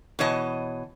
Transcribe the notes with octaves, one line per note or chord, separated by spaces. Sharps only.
B2 E3 C#5 D#5 A5